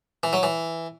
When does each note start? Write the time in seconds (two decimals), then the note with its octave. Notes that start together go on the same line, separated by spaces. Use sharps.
0.23 E3
0.33 F#3
0.43 E3